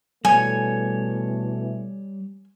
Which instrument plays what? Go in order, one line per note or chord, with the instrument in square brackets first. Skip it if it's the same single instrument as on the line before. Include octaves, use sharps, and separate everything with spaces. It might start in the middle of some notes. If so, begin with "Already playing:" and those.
[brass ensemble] B2 E3 A3 [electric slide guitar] G3 C#5 [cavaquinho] G#5